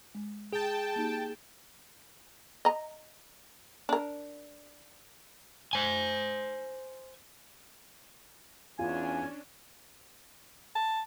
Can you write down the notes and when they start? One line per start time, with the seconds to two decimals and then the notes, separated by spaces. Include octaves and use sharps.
0.15 G#3
0.53 G#4 G5 A5
0.96 A#3 D#4 G4
2.65 D#5 A#5
3.89 D4 A#4
5.73 C5 G#5
8.79 E2 C#4 D4 F4 G#5
10.75 A5